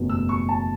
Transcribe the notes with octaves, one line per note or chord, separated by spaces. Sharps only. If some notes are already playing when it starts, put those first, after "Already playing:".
Already playing: F#1 E2 B2 F#3 A3
E6
C#6
A5